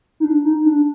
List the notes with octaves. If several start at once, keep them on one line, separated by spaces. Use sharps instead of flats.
D#4
D4
D#4
D4